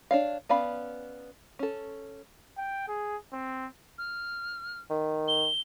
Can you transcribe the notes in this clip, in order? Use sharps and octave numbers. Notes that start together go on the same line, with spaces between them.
D4 C#5 F5
B3 C#4 D5 F5 B5
C#4 A4
G5
G#4
C4
F6
D#3
G7